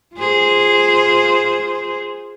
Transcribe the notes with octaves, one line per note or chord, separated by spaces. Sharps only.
F4 G#4 C5